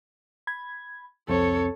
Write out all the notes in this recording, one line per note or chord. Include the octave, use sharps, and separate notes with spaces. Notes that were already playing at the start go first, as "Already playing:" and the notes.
B5 G#6
C2 F2 C4 A4 C#5